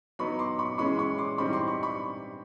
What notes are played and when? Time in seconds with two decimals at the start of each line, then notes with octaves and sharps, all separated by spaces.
0.19 F#3 B3 D#4 B5 C#6
0.39 C6 D6
0.59 B5 C#6
0.78 E3 G#3 C#4 B5 C#6
0.99 B5 C#6
1.18 C6 D6
1.38 E3 G3 C4 D#4 B5 C#6
1.53 C6 D6
1.68 B5 C#6
1.83 B5 C#6